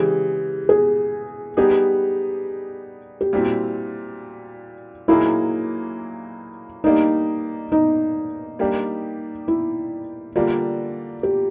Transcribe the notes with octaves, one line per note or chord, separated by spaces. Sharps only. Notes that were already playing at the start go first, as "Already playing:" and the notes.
Already playing: C#3 E3 G#3 G4
G#4
G3 B3 D#4 G4 G#4
G4
A#2 G3 C4 E4 F#4
A#2 F#3 A#3 D#4 E4 G#4
G3 A#3 D4 D#4
D#4
G3 A#3 D4 G4
E4
D3 G3 A#3 D4 F4
G4